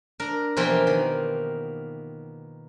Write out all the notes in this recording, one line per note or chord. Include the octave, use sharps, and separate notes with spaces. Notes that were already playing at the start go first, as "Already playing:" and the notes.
D4 A#4
B2 E3 F3 A#3 F4 G4
D#3